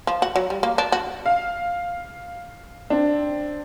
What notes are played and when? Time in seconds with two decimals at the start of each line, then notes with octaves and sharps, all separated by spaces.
0.07 F3
0.22 F#4
0.36 F#3
0.50 G3
0.63 A#3
0.78 D4
0.92 F#4
1.26 F5
2.90 C4 D4